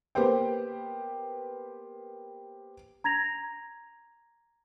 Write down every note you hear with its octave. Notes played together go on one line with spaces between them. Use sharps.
A#3 B3 G4 B4 C5 G5
A#5 G#6 A#6 F7